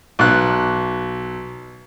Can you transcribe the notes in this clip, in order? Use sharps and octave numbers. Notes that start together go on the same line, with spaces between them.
B1 F#6